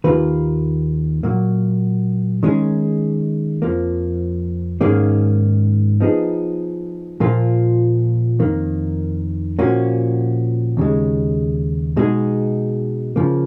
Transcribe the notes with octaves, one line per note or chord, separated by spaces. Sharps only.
D#2 D#3 A#3 F4 B4
A#2 F#3 A#3
D#3 G#3 C#4 G#4
F2 F3 A#3
G#2 D#3 A#3 C#4 G#4
F3 B3 D#4 G#4
A#2 F3 A#3 F4
F2 D#3 A#3
A#2 F3 A#3 C#4 F#4
D#2 C#3 G#3
B2 G#3 D#4 G#4
C#3 F3 A#3